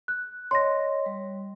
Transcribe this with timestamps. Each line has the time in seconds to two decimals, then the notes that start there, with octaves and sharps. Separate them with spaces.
0.08 F#6
0.51 C#5 D#5 C6 A#6
1.06 G3